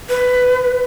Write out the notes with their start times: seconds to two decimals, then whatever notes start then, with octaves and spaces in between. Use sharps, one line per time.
0.09 B4